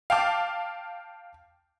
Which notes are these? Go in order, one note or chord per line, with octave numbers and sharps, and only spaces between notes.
F5 G5 A5 D6